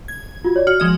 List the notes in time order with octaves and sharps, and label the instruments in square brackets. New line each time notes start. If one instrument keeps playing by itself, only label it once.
[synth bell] G#6
[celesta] F4 F#4
C#5 D5
[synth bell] F#4 [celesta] F6
[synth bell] F3 G#3 D#5